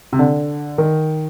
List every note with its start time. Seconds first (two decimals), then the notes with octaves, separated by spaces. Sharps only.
0.13 C3
0.19 D3
0.78 D#3